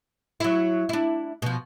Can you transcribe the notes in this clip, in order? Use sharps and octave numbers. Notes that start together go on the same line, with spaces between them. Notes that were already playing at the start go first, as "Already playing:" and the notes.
F#3 E4
D4 E4
B2 F3